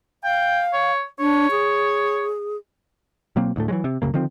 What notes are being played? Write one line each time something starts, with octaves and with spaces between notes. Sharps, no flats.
F5 G5
C#5
D4 C#5
G#4
B2 F#3 A#3 C4
D2 A2 A3
E3 F#3 G#3
C3
C2 F#2 C#3 A#3
D3 D#3 F3 C4